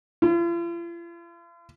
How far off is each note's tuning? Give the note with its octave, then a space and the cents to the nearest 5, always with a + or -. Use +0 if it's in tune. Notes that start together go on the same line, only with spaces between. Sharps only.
F4 -45